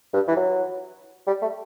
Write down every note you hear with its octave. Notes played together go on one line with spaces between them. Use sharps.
G2
E3
F#3
G3
A3